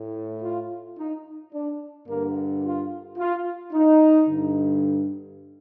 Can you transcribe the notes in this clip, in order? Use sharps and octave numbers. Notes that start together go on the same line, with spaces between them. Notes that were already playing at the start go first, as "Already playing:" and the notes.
Already playing: A2
F4
D#4
D4
G2 D3 A#3
F4
F4
D#4
G2 D3